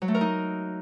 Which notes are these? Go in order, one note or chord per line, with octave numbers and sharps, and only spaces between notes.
F#3
A3
A#4
D#4